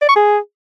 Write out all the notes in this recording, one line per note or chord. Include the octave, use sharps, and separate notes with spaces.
D5
C#6
G#4